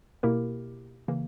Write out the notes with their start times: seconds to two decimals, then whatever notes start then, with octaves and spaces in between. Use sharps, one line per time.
0.23 B2 A#3 E4 G4 A#4
1.08 C#3 E3 A#3